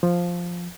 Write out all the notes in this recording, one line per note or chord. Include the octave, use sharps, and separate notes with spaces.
F3